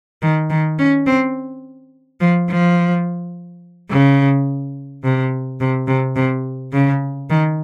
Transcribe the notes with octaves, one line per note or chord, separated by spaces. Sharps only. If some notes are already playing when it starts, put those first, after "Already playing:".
D#3
D#3
C#4
C4
F3
F3
C#3
C3
C3
C3
C3
C#3
D#3